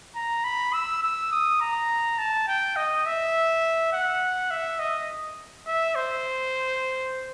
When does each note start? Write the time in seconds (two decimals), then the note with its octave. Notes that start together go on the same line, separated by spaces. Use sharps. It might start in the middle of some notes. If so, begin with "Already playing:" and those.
0.15 A#5
0.44 B5
0.73 E6
1.02 E6
1.31 D#6
1.60 A#5
2.19 A5
2.47 G5
2.76 D#5
3.06 E5
3.92 F#5
4.51 E5
4.79 D#5
5.67 E5
5.95 C5